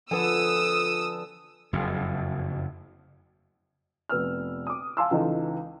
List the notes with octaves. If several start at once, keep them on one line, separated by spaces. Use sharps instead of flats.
D3 F3 A4 B4 G#5 D#6 E6
F#1 F2
F1 B3 E6 F6
D6 D#6
F5 G#5 A5 C6 D6 E6
C#2 E3 D#4 A4